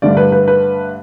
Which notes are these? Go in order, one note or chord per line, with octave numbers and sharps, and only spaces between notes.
G2 D3 A3 D5
B4
B4
B4